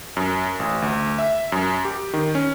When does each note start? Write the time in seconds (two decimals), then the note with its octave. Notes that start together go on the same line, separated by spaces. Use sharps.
0.17 F#2
0.60 A1
0.82 D2
1.19 E5
1.52 F#2
1.85 G4
2.14 D#3
2.35 C#4